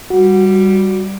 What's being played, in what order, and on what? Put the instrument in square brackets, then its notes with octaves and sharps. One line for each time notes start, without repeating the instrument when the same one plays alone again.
[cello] G3 [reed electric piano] F#4